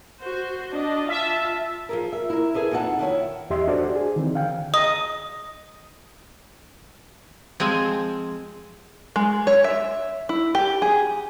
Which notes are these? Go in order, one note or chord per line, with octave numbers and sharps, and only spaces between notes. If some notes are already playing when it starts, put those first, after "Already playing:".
F#4 C5
D4 D#5
F4 E5 A5
F3 G#4 A#4
E5
E4 A#4
E4 G#4 A4 B4
F2 C#4 D#4 G#4 F#5 A5
D#3 E4 C#5
E2 G4 D#5 E5 C6
D4 F#4 A4 C5 D5
G#4
D#3 E3 C4
D3 F5 G5
D#5 D#6
F3 G#3 C4 G#5
G#3
C#5
E5
E4
G4
G#4